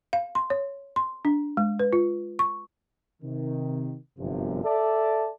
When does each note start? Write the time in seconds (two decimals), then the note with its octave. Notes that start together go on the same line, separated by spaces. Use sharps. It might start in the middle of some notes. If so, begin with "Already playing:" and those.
0.13 F5
0.35 C6
0.50 C#5
0.96 C6
1.25 D4
1.57 G#3
1.79 B4
1.93 F4
2.39 C#6
3.22 C3 D#3
4.19 G1 F#2 C3 F3
4.63 A4 D5 E5 A5